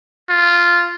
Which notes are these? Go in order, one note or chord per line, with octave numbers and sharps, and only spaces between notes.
F4